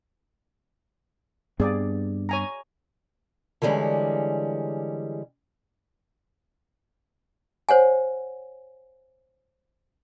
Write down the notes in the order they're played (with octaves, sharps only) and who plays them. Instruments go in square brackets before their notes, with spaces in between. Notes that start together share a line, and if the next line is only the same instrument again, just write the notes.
[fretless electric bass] G2 B3 C4 [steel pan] G#4 D5
[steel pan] C#5 G#5 A#5
[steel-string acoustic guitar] D3 E3 G3 G#3 C#4
[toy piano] C5 C#5 F#5 G#5